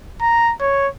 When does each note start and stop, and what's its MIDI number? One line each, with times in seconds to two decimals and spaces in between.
0.21 0.53 82
0.61 0.88 73